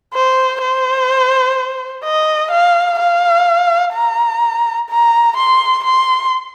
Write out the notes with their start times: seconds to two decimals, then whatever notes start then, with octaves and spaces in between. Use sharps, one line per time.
0.14 C5
0.62 C5
2.04 D#5
2.51 F5
2.99 F5
3.94 A#5
4.90 A#5
5.37 C6
5.84 C6